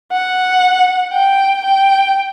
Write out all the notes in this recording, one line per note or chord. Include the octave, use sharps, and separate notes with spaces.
F#5
G5
G5